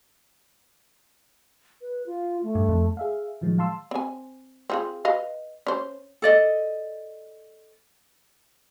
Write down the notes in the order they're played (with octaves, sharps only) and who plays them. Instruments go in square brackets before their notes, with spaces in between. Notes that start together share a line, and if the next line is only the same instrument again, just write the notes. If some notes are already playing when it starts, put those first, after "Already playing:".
[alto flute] B4
F4
A3
[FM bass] G2
F2
[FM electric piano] G#4 E5 F5
A2 D#3 F3 F#3 G#3
F5 A5 C6 E6
[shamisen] C4 G#5
C4 F4 G#4
B4 D#5 F5
C#4 C5
[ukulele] A4 D5 D#5